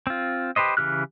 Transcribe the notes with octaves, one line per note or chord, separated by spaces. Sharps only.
C4 F4
G4 B4 C5 D#5
C#3 E3 G4 F6 F#6